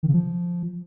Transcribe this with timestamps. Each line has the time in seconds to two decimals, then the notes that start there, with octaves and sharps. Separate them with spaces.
0.03 D#3
0.08 C#3
0.13 F3